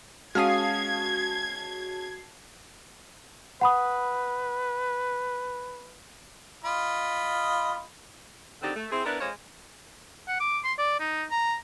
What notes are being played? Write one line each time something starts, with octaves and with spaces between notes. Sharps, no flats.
G#3 C#4 F#4 F5 A5 D#6 G#6 C7
B4 F#5 B5 D#6
F4 D#5 B5
D3 D#3 C4 D#4 G4 D5
A3
C4 E4 G#4
B3 D4 E4 A#4 B4
F2 G#3 C5 C#5 F5
F#5
D6
C6
D5
D#4
A#5